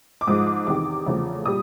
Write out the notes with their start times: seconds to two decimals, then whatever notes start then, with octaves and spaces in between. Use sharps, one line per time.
0.21 D6
0.27 G#2 F3 G#3 D#6
0.47 D6
0.67 E2 C3 D#3 D6
1.06 E2 C#3 F3 A3
1.45 A#2 G3 D#6